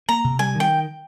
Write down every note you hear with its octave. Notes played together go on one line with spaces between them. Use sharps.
A#3 A#5
C3
G3 G#5
D#3
G5